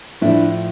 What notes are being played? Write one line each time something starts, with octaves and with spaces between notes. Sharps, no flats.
A2 F3 D4 E4